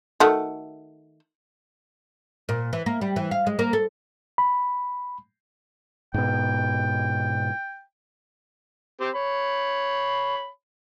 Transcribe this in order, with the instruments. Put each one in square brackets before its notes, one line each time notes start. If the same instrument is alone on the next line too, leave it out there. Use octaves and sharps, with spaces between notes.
[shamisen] D#3 A3 F#4
[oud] A#2
E3
A#3
G3
E3
F5
G#3
A#3
A4
[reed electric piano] B5
[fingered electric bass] G#2 B2 [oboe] G5
[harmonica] C4 G4
C#5 B5